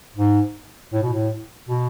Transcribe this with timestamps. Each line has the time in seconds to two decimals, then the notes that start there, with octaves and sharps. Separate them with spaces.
0.17 G#2
0.93 A2
1.03 B2
1.13 A2
1.69 B2